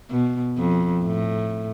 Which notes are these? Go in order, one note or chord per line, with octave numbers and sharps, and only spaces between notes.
B2
F2
A2